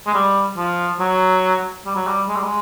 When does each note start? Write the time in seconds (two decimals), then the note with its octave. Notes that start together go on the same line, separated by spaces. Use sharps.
0.07 G#3
0.14 G3
0.57 F3
1.00 F#3
1.86 G3
1.96 F#3
2.07 G3
2.28 G#3
2.36 G3
2.44 G#3